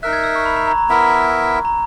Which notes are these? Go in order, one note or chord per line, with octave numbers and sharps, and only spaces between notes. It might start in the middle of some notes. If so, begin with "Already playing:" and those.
D#4 A#4 E5 F#6
G#6
E6
C#6
B5
A#5
A#5
A#5
B3 E4 A#4 E5
A#5